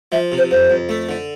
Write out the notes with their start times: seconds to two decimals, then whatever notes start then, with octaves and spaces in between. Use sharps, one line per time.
0.12 F3 E5
0.32 C3
0.38 C5
0.51 F2 C5
0.70 F2
0.89 A3
1.09 D3